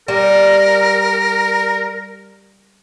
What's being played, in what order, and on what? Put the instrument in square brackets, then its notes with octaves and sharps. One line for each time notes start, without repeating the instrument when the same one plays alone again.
[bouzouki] G3 [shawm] A#4